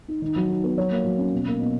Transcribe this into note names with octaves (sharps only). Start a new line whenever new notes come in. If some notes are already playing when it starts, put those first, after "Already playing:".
D#4
D#3
F#3
D#4
B3
F#3 C#5
A#3
F#3
C#4
B2
A#3
B2